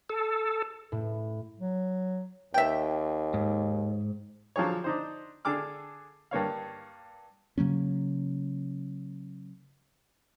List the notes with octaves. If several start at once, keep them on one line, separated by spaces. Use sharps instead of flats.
A4
A2
F#3
D#2 E5 G5
G#2
D3 F3 F#3 G#4 C#5
D4 D#4 C5
D3 D4 G#4 A4 D6 F6
G2 A#3 C#5 F5
C#3 F#3 A#3 C#4